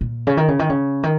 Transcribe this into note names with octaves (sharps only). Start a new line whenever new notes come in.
A#2
C#3
D#3
C#3
D#3
C#3
D#3